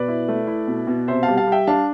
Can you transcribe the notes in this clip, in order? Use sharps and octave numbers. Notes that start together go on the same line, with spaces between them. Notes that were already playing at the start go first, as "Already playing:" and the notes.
Already playing: B2 B4 D5
E4
A3
E4
B2
B2
C3 C5 E5
F5 A5
G3
F5 A5
G3
E5 G5
D4 F5 A5